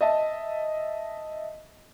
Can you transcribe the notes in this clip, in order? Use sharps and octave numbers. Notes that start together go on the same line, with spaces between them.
D#5 E5 A5